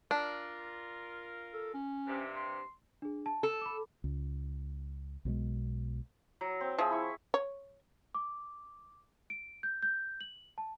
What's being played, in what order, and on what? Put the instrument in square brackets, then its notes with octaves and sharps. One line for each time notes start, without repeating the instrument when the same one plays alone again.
[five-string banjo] D4 [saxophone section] F4 A#4
[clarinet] A4
C#4
[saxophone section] G2 C3
[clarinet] C6
[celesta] D4 G#4
A5
[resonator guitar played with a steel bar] A4
[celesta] B5 D6
[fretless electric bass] C#2
B1 B2 F#3 G#3
[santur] F#3
C4
[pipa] F3 [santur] G#4 E5
[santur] E4 C#6
[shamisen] C#5
[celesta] D6
D7
G6
G6
F#7
A5